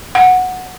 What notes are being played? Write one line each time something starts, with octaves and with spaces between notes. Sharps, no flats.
F#5